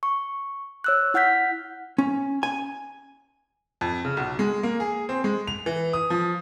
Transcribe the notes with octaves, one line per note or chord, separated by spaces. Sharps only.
C#6
C#5 E6 F#6
E4 F#5 F6 G6 B6
C#4
G#5
F2
C#3
B1
G#3
A#3
G#4
C4
G#3
F7
E3
D#6
F3